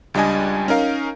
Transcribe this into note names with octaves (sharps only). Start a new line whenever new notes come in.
C#2 G3 D4 D#5 G#5
C#4 D#4 A#4 F5